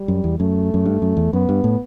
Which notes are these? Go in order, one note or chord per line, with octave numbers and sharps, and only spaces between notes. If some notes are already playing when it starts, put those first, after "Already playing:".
Already playing: G3
F#2
E2
F#2 A3
F#2
G2
F#2
E2
F#2 B3
G2
A2